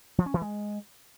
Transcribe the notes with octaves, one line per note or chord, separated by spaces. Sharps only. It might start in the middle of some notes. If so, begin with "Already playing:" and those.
F3
C#4
E3
G#3